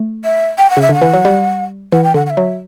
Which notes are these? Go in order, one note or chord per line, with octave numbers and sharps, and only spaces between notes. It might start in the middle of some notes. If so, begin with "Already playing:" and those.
Already playing: A3
E5
G5
F#5
C#3 E5
D3 F#5
E3
F#3
G3
E3 F#5
G5
D3 F#5
F#5
E5
F#3